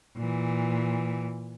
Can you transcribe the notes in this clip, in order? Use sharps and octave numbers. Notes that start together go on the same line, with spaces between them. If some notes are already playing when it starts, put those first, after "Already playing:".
A#2 E3